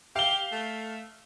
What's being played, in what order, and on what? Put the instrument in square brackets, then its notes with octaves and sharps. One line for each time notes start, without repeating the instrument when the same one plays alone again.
[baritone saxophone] G4 [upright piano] F5 G7
[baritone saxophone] A3